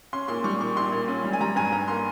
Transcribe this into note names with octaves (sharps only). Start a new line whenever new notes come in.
C#4 C6
A#2 C6
G3 C#6
A#2 C#6
A#1 C6
A#2
C#4
G3
G#5
G3 A#5
G2 G#5
G2 A#5
A#3 C6